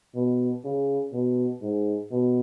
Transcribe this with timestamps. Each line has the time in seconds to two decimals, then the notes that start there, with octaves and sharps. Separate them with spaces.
0.15 B2
0.64 C#3
1.13 B2
1.62 G#2
2.11 B2